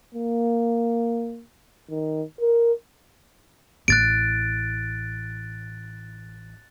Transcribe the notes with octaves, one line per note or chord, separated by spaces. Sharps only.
A#3
D#3
A#4
A1 E4 F#6 A6 D7